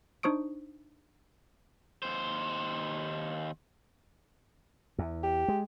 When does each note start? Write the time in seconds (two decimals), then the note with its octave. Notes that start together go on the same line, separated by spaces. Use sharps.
0.23 D4 D#4 C5 C#6 D#6 D7
2.02 D#2 C5
4.98 E2
5.23 G4
5.48 G#3